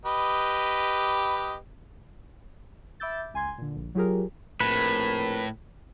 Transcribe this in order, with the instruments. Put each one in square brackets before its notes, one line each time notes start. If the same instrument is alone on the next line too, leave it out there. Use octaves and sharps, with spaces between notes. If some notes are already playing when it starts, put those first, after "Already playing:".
[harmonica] G4 B4 D#5
[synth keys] E5 B5 D6 E6 G6 A6
C#2 G#5 C6 G#6
A#2 D3
A#1
F#3 F4 G4 G#4 A#4
[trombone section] A#1 C4 A#4 [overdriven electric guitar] A2 [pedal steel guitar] B4